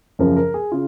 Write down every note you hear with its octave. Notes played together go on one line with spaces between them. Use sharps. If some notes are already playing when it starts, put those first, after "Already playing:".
F#2 C#3 F3 A#4
A#4
G#4
C#3 F4